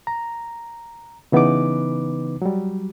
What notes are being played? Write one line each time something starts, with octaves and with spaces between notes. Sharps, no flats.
A#5
C#3 E3 B3 D#4 B4 D6
F#3 G3